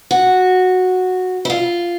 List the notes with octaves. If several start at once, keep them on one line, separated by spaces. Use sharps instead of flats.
F#4
E4
F4